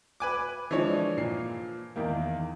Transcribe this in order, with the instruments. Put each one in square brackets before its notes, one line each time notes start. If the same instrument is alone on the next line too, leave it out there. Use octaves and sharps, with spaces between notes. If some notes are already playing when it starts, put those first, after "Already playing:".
[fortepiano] B4 G#5 D6
[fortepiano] E3 F3 [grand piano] G#3 D4 C#5
[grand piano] A#2 C7
E2 D#3 A#3